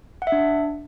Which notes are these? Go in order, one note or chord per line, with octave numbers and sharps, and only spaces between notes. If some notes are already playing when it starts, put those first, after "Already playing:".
F#5
E5
D4